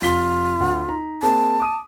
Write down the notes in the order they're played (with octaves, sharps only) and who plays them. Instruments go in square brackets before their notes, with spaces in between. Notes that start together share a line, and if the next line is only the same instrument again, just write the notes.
[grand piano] F1 B6 G7 [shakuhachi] F4
[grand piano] D2 F#5
D#4 A#5
[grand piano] A#3 C4 G#4 [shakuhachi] A5
[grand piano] D6 D#6 D#7